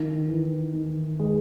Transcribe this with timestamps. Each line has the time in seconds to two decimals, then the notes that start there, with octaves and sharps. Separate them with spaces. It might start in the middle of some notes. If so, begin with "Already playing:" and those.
Already playing: D#3
0.28 E3
0.73 D#3
1.19 G#3